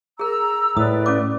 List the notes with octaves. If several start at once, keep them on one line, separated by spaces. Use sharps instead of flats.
G#4 A#4 A#5 E6
A2 B4 D5 D#6
C#4 A4 D6